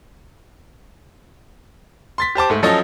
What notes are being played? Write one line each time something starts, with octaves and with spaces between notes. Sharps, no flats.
C6 A6 B6
G4 C5 A5 D6
G#2 A3
F3 F#3 C#4 A4 C#5 D#5